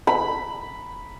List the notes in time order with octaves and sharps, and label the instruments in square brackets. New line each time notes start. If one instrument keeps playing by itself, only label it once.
[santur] B5